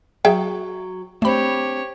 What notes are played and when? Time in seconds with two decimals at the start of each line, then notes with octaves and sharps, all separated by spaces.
0.25 F#3 G#4 E5 G5
1.22 A3 C4 D4 G4 C#5 B5